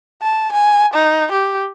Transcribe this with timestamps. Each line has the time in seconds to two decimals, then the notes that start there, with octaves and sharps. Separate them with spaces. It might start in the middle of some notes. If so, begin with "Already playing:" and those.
0.22 A5
0.52 G#5
0.94 D#4
1.32 G4